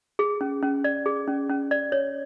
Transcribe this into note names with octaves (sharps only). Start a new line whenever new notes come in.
G#4
C#4
C#4
D5
G#4
C#4
C#4
D5
C#5